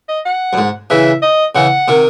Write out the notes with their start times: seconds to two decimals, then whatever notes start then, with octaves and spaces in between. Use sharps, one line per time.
0.08 D#5
0.25 F#5
0.53 F#2
0.58 G#2
0.90 C#3 E3 E5
1.22 D#5
1.55 C#3 E3 F#5
1.88 C3 D#3